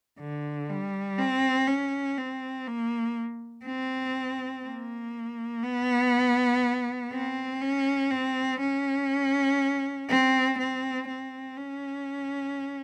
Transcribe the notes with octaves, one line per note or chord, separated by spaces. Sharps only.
D3
G3
C4
C#4
C4
A#3
C4
A#3
B3
C4
C#4
C4
C#4
C4
C4
C4
C#4